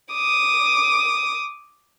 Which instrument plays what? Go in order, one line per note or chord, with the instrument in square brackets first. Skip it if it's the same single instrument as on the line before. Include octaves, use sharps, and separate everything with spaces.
[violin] D6 D#6